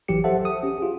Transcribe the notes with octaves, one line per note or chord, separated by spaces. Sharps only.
A1 E3 F#3 G4 C#7
G4 A4 C5 E5 F#5 A5
D#6
C#4 G4
F4 G#4